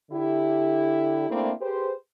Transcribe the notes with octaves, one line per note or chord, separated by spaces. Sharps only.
D3 E4 G4
A3 A#3 C4 D4 E4
G4 G#4 B4 C5